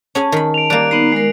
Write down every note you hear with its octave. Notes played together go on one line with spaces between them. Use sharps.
C#4 G#4 G#5 A5
D#3 B5
D7 F7
G3 A#3 F#6 D7
B3 D#4 A#5 C7 F#7
G#3 A#4